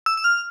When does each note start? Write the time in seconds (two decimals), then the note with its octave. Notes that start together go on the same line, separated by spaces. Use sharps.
0.06 E6
0.17 E6
0.24 F6